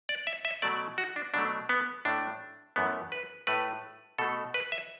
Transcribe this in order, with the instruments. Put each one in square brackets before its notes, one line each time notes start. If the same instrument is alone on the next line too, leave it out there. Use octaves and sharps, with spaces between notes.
[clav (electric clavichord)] D5
E5
E5
B2 F#3 A3 D5
F#4
D4
B2 F#3 A3 D4
B3
A2 A3 D4
F#2 E3 A3 B3
B4
A2 A3 B4
B2 A3 A4
B4
E5